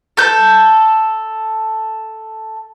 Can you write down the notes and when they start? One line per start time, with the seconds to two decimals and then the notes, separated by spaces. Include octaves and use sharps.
0.17 A4 G6